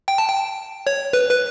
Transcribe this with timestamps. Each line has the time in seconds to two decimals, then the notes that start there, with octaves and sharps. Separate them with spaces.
0.08 G5
0.18 A5
0.28 G5
0.87 C#5
1.13 B4
1.31 B4